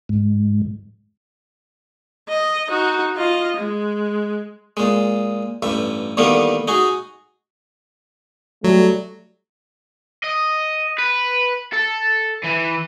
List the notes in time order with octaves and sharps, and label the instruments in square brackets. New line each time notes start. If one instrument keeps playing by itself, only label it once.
[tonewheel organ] G#2
[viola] D#5
D#4 F#4
F4 D#5
G#3
[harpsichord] A#2 G#3
A1 G2 E5
E2 D3 D#3 G3 A#3 B3
D#4 F#4 G#4
[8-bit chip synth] F#3 [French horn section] G3 A3
[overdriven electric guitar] D#5
B4
A4
E3